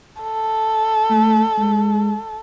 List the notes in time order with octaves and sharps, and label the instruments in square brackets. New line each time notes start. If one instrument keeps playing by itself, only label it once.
[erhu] A4
[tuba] A3
G#3